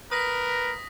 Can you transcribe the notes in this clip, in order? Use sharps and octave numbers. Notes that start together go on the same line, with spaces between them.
A#4 B4 D#6 A#6 B6